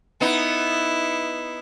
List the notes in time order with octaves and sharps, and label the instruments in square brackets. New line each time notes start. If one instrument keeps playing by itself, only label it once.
[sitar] B3 D#4 [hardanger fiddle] E4